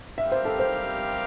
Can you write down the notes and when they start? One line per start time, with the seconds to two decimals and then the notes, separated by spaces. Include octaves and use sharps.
0.18 G3 C4 G4 A#4 E5 F5
0.32 C5
0.45 A4
0.59 C5